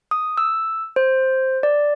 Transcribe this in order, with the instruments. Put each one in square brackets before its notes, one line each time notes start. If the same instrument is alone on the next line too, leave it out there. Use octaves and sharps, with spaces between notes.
[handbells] D#6
E6
C5
D5